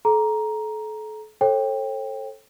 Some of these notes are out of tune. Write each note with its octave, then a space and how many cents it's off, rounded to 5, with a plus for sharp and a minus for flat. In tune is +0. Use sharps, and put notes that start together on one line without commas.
A4 -35 A#5 +10
A4 +0 C#5 -45 G5 +15